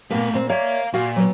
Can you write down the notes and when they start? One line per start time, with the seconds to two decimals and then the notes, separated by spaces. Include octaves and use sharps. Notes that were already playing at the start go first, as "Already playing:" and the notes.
0.11 A#2 A3 B3 B4 F5
0.34 A#2 C4
0.50 C#5 D5 E5 F5 A#5
0.94 A#2 F#4 F5
1.16 F#3 B3